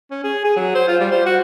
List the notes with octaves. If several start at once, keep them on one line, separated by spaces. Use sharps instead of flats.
C#4
G#4
G#4
F#3
C5
F4
G3
C5
F#4